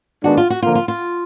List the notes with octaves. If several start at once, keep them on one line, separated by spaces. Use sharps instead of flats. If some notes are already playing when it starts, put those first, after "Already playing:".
D#3 G#3 B3 D4 F#4
F4
F#4
D3 F3 A#3 F4
F4
F4